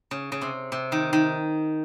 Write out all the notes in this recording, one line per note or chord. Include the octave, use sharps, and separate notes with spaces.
C#3
C#3
C3
C3
D#3
D#3